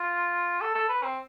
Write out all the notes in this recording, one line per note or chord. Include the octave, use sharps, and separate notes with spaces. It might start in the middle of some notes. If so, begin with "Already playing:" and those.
Already playing: F4
A4
A4
B4
C4